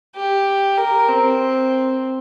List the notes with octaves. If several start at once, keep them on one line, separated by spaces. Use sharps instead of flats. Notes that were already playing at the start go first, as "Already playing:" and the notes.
G4
A#4
C4